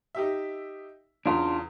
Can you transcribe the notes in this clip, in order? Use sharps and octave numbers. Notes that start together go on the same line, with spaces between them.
D#4 G4 E5
E2 C#3 D4 F4